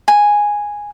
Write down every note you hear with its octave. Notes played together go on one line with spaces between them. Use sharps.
G#5